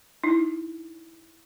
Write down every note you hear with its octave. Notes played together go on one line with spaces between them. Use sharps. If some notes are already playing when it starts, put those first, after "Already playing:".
D#4 E4